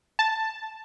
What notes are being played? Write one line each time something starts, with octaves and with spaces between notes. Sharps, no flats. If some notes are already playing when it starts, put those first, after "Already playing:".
A5